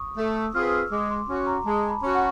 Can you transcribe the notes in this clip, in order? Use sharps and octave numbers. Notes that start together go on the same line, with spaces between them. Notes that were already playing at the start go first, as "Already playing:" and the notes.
Already playing: C#6 D#6
A3
E6
C4 F4 G#4 B4 F6
E6
G#3 D6
C6
C#4 F#4
A#5
G#3 A5
B5
C#4 F#4
F#5